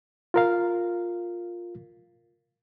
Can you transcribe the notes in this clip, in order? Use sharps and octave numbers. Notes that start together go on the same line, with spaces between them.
F4 A#4 F5